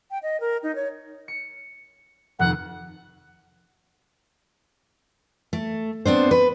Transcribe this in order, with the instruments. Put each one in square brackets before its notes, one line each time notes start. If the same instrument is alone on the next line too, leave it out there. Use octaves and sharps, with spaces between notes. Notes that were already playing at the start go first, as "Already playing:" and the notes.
[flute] G5
D#5
A#4
D#4
C#5
[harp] C#7
[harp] F1 F2 D#3 [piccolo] F#5
[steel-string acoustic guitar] A3
B3 C4 D4 C5
B4